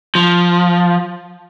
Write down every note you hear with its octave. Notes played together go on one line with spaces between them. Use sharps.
F3